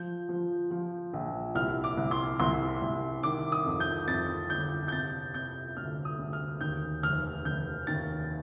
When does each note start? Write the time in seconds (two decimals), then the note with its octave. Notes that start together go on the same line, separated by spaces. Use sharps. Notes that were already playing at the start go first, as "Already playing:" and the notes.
Already playing: F3 G6
0.29 F3
0.71 F3
1.13 A#1
1.55 C2 F6
1.84 D6
1.97 C2
2.11 C6
2.40 C2 C6
2.82 C2
3.23 D#3 D6
3.52 D#6
3.66 F2
3.80 G6
4.08 F2 A6
4.50 G1 G6
4.88 G6
4.92 C3 A6
5.34 C3 G6
5.76 D2 F6
6.05 D#6
6.19 D2
6.33 F6
6.61 D#2 G6
7.03 F1 F6
7.45 F1 G6
7.87 D#2 A6